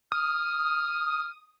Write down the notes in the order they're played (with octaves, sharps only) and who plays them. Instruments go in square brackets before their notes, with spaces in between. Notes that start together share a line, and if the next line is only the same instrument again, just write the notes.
[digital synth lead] D#6 [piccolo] F6